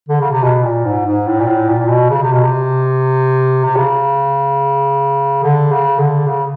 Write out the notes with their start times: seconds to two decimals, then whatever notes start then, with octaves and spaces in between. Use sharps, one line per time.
0.09 D3
0.21 C#3
0.32 C3
0.44 B2
0.64 A#2
0.85 G#2
1.06 G#2
1.27 A2
1.40 A#2
1.47 A2
1.69 A#2
1.79 A#2
1.89 B2
2.10 C#3
2.22 C3
2.33 B2
2.44 C3
3.65 C3
3.77 C#3
5.43 D3
5.72 C#3
5.99 D3
6.27 C#3